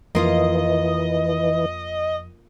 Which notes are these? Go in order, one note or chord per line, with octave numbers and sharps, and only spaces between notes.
F2 E3 A#3 F4 D#5